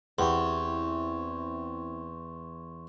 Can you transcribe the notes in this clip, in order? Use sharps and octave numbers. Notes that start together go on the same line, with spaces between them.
E2 B3 C4 E4 G4 C6 C#6